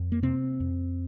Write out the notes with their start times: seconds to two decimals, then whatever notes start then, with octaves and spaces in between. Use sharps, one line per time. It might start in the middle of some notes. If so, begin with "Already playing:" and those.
Already playing: F2
0.12 A#3
0.23 C3 C4
0.60 F2